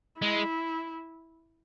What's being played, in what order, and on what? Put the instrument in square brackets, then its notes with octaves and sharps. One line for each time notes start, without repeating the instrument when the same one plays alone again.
[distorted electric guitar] G#3 [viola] E4